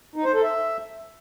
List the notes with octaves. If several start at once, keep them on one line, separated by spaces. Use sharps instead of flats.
D#4
C5
A4
E5